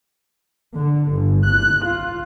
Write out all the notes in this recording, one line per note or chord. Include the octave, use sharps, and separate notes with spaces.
D3
G1
F#6
F4